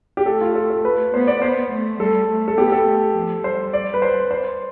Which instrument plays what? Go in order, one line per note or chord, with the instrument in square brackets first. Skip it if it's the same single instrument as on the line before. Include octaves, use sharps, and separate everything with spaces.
[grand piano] G4
[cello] A3 [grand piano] A4
[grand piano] F4
A4
A4
B4
[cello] B3 [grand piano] C5
[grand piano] D5
[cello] B3 [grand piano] C5
[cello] A3
[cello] G3 [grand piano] A4
[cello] A3
[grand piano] A4
[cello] B3 [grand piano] G4
[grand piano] A4
[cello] A3
F3
[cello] G3 [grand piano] C5
[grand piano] D5
B4
C5
C5